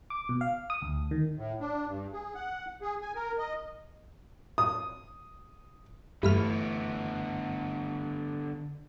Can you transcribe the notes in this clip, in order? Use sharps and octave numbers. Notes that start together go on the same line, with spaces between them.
D6
B2
F5
D#6
D2
D#3
A2
D4
G2
G#4
F#5
G#4
G#5
A#4
D#5
D#6
G2 D3 E3 A3 B3 E4 B5 F6